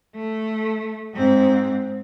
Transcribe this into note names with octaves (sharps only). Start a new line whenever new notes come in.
A3
G#2 C4